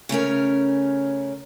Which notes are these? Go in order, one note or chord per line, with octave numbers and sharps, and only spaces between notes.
C#3 A3 C#4 A#4